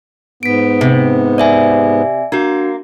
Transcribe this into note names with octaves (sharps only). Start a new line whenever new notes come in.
G#2 B3 B6 D7
C3
D5 E5 G#5
A#3 D4 F#4